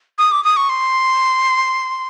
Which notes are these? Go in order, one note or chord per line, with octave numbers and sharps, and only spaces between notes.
D#6
D6
D#6
C#6
C6